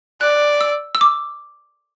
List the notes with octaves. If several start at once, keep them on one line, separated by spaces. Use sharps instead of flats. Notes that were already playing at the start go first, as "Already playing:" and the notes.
D5 F#6
E6
E6
D6